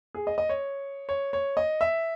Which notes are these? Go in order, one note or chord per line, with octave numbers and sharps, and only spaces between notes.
G#4
D#5
D#5
C#5
C#5
C#5
D#5
E5